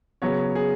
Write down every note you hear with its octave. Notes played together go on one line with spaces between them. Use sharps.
C#3 F#3 B3 C#5
G#4